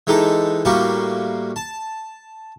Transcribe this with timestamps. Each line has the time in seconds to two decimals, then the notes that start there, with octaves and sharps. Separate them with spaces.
0.07 E3 G#3 D#4 G4 A4
0.65 A2 G3 A#3 F#4 G4
1.56 A5